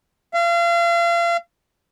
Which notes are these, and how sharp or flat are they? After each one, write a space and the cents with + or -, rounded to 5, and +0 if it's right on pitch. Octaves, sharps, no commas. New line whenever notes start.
F5 -35